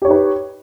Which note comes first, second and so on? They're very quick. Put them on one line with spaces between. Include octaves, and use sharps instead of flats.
G4 C#5 D#4 B4